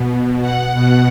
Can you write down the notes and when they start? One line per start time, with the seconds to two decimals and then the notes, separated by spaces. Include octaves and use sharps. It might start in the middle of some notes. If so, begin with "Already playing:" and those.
Already playing: B2
0.42 F#5
0.73 B2 F#5